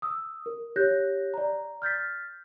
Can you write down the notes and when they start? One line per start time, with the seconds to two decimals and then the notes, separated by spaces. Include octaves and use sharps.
0.02 D#6 E6
0.46 A#4
0.76 G4 C#5 F#6 G6 A#6
1.34 D5 A#5
1.82 F6 G6 A6 B6